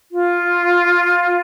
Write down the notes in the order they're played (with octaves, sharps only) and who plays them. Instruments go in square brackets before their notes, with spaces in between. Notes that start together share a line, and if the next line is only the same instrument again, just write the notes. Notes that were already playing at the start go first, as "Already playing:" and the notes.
[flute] F4